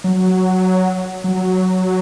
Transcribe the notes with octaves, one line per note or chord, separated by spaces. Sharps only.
F#3
F#3